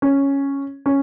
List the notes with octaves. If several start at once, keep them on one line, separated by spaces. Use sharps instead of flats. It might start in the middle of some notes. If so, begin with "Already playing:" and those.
C#4
C#4